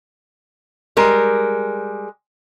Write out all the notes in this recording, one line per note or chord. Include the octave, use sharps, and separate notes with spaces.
G3 G#3 A#4